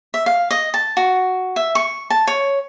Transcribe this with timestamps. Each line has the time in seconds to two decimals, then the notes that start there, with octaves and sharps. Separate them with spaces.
0.14 E5
0.26 F5
0.51 D#5
0.74 A5
0.97 F#4
1.56 E5
1.75 C#6
2.10 A5
2.27 C#5